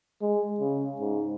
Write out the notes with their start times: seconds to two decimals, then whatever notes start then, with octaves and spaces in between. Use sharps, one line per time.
0.21 G#3
0.60 C#3
1.00 G#2